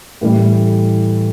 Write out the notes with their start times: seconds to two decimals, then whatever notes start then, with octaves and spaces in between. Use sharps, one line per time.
0.21 A2 E3 G3